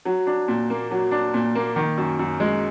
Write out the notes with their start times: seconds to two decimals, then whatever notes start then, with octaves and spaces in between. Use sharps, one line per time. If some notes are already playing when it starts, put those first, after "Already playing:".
0.05 F#3
0.27 D4
0.48 A#2
0.70 A#3
0.91 F#3
1.11 D4
1.34 A#2
1.55 A#3
1.76 D#3
1.97 F#2
2.19 F#2
2.40 G#3